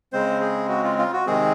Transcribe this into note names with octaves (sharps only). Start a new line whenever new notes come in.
C#3 G#3 C4 C5
G#4
F#4
F4
F4
F#4
C3 D#3 G#3 C4 G#4